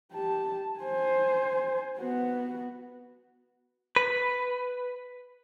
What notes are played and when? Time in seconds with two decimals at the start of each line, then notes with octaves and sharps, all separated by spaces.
0.12 G4 A5
0.80 C5 G#5
1.98 B3 F#4
3.96 B4